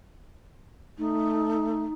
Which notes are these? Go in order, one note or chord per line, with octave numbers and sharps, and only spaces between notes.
A3 D#4